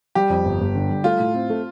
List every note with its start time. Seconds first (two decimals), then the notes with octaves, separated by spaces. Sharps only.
0.15 G3 G4
0.30 F2
0.45 G1
0.61 G1
0.75 D3
0.89 G3
1.04 A3 F4
1.20 A2
1.35 C4
1.50 A3